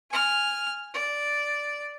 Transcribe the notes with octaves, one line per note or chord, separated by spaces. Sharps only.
G#5 F6
D5